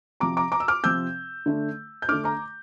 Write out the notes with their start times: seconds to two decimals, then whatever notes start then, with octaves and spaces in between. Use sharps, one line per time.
0.20 C3 F3 C4 A#5 D6
0.37 A#5 D6
0.52 A#5 D6
0.60 E6
0.68 D6 F6
0.83 C3 F3 C4 E6 G6
1.46 D3 A3 D4
2.02 G6
2.09 D3 A3 D4 D6 F6
2.24 A#5 D6